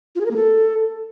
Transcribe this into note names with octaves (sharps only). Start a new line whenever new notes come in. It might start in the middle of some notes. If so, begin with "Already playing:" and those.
F4
G#4
A#4
A#3
A4